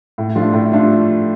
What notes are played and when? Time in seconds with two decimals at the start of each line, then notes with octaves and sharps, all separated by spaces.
0.18 A2
0.36 F3 A3 D4 F4
0.53 A2
0.72 F3 A3 D4 F4